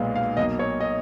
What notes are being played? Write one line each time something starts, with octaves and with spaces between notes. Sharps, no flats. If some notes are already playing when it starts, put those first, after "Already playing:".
Already playing: B1 A#2 G#3 B3 F5
F5
B1 B2 A#3 D#5
C#5
D#5